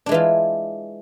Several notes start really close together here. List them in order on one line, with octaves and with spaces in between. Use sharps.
D4 G#3 E3 F4